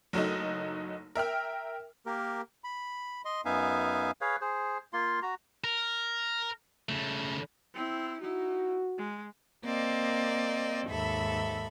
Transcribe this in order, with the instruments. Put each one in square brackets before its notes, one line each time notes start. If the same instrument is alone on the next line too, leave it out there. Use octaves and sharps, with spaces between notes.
[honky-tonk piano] F#1 F#3 A3 D#4
A#4 E5 G5 F6
[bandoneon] A#3 G4 A#4
B5
D#5 C6
F#2 B3 D#4 E5 F5 G#5
[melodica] G#4 B4 C#5 F5
G#4 C5
A#3 F4 C6
F#4 A#5
[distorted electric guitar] A#4
C#3 A3
[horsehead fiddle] C4 E4
[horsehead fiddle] D#4 E4 [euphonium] F#4
[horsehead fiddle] G#3
[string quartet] A#3 C4 D5 D#5
D#2 G#2 A4 E5 B5